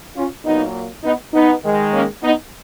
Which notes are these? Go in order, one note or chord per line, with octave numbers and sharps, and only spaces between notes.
C#4 F4
A#2 F#3 A#3 B3 D#4
B3 D#4
B3 D#4
D#3 G#3
A#3 C#4
B3 D#4